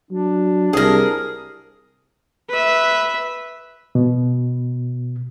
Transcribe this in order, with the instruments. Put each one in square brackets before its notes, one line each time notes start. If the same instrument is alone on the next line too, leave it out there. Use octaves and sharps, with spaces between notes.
[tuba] F#3 [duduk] D4
[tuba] C2 [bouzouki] G#4 A#4
[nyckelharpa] B4 E5
[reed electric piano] B2